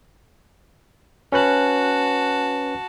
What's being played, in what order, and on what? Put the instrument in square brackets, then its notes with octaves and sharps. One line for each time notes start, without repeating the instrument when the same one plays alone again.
[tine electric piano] C#4 B4 F#6 [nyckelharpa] F#4 A5